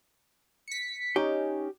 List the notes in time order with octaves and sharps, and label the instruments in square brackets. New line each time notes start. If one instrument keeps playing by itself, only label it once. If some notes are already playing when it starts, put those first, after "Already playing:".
[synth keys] B6 C#7
[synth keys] C#4 D#4 [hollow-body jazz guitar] G4